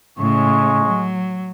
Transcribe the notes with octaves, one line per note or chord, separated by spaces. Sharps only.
A2 C#3 G#3 C#6
F#3